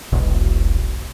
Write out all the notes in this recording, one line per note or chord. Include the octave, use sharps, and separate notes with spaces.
E1 B1